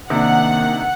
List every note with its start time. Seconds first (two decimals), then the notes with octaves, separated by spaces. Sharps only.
0.10 C3 D#3 A#3 D4 F#5